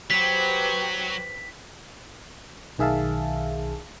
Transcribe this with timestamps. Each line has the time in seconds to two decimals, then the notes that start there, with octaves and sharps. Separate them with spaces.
0.10 F#3 G4 B4 C5 B6
2.78 B1 D#3 G#4 E5 F5 A5